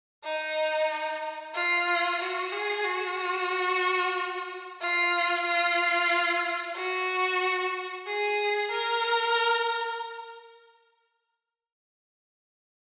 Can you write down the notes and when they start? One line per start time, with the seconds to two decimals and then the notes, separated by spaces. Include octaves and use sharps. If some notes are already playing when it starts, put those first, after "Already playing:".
0.24 D#4
1.55 F4
2.21 F#4
2.53 G#4
2.85 F#4
4.81 F4
5.45 F4
6.76 F#4
8.07 G#4
8.72 A#4